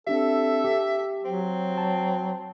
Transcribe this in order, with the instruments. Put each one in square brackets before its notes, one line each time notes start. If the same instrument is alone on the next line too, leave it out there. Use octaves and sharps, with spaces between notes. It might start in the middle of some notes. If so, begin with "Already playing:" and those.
[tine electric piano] C4 D4 G4 [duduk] A4 [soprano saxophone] E5
[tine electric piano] G4
[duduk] F#3 [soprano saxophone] C4
[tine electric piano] A5